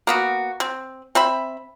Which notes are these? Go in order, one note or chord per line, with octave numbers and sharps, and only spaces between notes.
A#3 B3 F#4
C4
C4 E5 B5